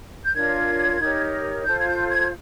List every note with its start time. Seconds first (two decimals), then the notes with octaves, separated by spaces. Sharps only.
0.23 G6
0.33 D4 F4 A#4 C#5 G#6
0.99 D#4 G4 A#4 C#5
1.65 F4 A4 C5 G6
1.78 G#6
1.88 G6
2.09 G#6